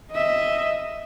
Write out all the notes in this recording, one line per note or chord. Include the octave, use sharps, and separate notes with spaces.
D#5 E5